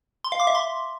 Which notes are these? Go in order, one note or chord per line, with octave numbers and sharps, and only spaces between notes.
C6
F5
D6
E5
C6